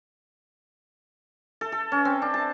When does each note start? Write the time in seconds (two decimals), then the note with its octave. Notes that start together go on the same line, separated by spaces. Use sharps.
1.61 A4
1.72 A4
1.92 C#4
2.05 C4
2.22 D4
2.34 A5